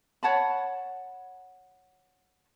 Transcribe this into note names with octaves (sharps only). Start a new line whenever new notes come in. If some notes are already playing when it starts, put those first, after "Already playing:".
C#5 F#5 A5 B5